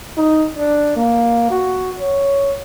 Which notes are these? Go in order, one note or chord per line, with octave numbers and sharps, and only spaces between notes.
D#4
D4
A#3
F#4
C#5